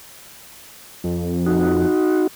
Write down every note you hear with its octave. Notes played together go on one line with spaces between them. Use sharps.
F2
D#4 F#4